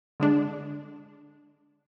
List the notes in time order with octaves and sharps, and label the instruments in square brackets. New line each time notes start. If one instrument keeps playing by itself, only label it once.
[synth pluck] D3 G#3 D4